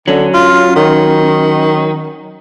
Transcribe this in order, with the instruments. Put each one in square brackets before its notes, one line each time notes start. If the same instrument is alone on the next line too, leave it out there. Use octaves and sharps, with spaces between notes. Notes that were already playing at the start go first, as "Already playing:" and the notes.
[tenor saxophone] D3 [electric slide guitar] F#3 C#4
[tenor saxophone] F4
D#3